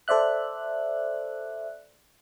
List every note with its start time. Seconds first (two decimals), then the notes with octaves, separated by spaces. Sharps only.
0.08 A4 C5 D5 E5 F#6